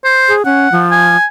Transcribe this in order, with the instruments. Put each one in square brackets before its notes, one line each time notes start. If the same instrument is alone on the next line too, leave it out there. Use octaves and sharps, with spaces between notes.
[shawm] C5
[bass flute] G#4
[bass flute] C#4 [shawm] F#5
[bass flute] F3
[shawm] G#5